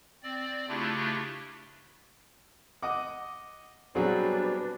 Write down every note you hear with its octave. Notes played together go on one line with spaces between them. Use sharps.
C4 D5
C#3 A3 D4 E4 F4 G4
D#5 F#5 D6 D#6
B2 F#3 G3 C4 D4 G#4 B4